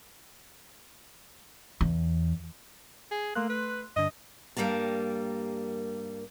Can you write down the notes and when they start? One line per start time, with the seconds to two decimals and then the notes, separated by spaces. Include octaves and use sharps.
1.81 E2
3.11 G#4
3.35 A3 A#3 C6 F#6
3.50 B4
3.96 G2 D3 D#5
4.57 G2 G3 A#3 A#4 A5